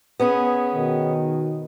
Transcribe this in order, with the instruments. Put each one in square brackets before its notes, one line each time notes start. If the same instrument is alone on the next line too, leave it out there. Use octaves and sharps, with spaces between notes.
[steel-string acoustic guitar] B3 C#4 G#4
[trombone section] B2 D#3